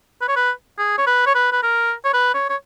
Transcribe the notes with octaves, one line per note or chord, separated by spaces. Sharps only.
B4
C#5
B4
G#4
C#5
B4
C#5
B4
B4
A#4
C#5
B4
C#5
C#5